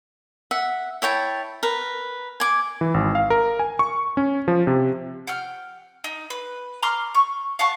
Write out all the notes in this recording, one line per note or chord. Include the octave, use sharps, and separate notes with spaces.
E5 F#5
E4 C#5 G5 A5
A#4 B4
G#5 D6
E3
G#1
F5
A#4
G#5
C#6
C#4
F3
C3
F#5 G5 F6
D#4
B4
A#5 C6 D6 F6
C#6
F5 F#5 A5 C#6